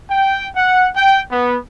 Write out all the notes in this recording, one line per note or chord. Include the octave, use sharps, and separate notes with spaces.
G5
F#5
G5
B3